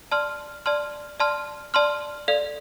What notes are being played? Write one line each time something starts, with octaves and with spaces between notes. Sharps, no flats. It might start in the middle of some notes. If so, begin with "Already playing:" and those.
D5 A5 C6 F6
D5 A5 C6 F6
D5 A5 C6 F6
D5 A5 C6 F6
A4 D5 F5